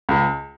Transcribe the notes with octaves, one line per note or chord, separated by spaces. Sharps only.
C#2